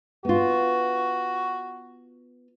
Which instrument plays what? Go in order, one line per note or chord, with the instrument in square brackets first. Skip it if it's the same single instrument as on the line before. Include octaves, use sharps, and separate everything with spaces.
[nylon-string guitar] B3 F4 [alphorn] F#4